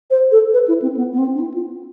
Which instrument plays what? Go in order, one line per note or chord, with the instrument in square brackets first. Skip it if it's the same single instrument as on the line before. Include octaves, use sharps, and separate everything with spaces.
[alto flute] C5
A4
B4
E4
C4
B3
B3
C4
D4
E4
F4